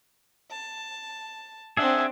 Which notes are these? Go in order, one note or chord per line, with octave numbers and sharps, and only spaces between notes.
A5
C4 D4 G#4 E5 F#5